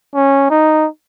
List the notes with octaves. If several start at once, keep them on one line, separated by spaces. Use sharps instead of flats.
C#4
D#4